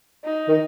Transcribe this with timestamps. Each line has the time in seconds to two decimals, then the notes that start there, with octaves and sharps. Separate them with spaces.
0.25 D#4
0.48 D#3